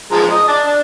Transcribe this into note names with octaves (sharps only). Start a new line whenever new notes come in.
F3 G#3 A#5
D#5
D5 A5
D4